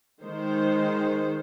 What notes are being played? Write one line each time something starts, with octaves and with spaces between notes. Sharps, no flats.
D#3 G#3 C5